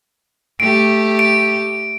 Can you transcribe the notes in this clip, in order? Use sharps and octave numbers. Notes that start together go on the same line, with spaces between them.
A3 G4 D7
D7